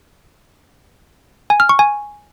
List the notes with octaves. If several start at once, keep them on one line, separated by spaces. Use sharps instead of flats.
G#5
F6
C#6
G#5